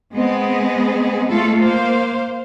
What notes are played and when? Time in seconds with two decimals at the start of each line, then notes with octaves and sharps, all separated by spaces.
0.14 G#3 B3 C4 G#4 D#5
1.29 G#3 A3 F4 A4
1.61 A#3 C5 F5